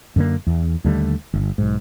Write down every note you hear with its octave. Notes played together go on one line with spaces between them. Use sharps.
F#2 D3 A#3
E2
D#2 D3 G3 A3
G1
B1 G#2